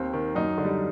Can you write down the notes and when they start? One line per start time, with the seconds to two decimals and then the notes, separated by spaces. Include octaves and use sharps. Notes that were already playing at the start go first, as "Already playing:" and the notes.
Already playing: D#2 C4
0.13 D#3
0.35 F#2 D#4
0.58 D3
0.65 G3